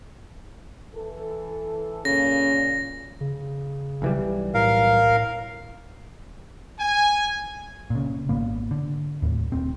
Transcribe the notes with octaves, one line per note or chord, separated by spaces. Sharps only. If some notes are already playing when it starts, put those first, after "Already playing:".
E3 A4
A#2 C#3 A#6
C#3
B1 E3 G3
A2 A#4 F5
G#5
A#2 C#3
G#1 A#3 B3
D3
D#2 A2
D#1 C4